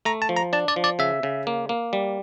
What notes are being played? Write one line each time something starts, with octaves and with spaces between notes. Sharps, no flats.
A3 A#5
A5
F3
A#5
D4 A5
D5
F3
D5
C#3 E5
C#3
A#3
A#3
G3